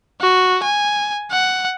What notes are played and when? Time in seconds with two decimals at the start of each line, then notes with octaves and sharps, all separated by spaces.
0.21 F#4
0.63 G#5
1.32 F#5